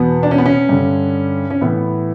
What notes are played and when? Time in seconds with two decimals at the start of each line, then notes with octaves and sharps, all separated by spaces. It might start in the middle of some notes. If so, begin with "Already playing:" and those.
Already playing: E2 B2 B3
0.23 D4
0.31 C#4
0.38 B3
0.46 C#4
0.69 G2 D3
1.51 C#4
1.61 A2 E3 B3